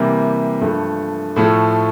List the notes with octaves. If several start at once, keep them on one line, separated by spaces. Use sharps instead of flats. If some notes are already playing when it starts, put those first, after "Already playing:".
Already playing: C3 E3 G3 A#3
G2 F3 A3
A2 F3 A3